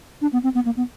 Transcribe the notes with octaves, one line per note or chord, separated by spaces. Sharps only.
D4
B3
C4
B3
A#3
B3